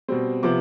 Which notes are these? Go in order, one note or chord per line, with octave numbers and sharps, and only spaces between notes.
B2 G3 C4
C3 F3 B3 D6